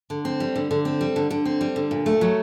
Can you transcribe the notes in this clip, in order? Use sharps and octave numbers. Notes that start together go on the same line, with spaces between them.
D3
C4
G3
D3
D3
C4
G3
D3
D3
C4
G3
D3
A#2
A3
F#3